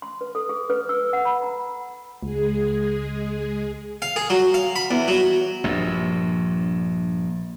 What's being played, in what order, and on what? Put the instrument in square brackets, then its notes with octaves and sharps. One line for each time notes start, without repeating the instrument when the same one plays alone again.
[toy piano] C6
B4
A4
G#4
B4
E6
F#5
B5
A#5
[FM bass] C#2 [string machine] G#3 G#4
[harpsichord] F5
G#4
F#3
F5
B5
E2
F#3
[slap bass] A#1 G2